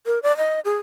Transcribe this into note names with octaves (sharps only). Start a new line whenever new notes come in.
A#4
D5
D#5
G#4